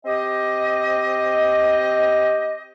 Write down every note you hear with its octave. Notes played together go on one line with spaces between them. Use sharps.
C4 G4 D#5